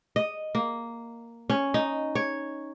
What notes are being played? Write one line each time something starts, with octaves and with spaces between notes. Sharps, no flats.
D#5
A#3
C#4
D#4
C#5